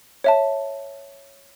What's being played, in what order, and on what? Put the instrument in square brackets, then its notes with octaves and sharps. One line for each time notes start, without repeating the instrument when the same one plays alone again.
[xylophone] C#5 E5 A5